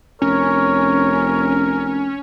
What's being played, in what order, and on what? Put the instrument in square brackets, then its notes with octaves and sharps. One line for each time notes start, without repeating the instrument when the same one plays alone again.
[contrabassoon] F1 [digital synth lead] C#4 [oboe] A#4 [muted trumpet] C#5